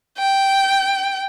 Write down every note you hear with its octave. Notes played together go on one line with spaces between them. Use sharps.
G5